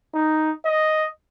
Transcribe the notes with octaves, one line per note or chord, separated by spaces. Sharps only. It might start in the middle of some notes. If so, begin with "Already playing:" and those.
D#4
D#5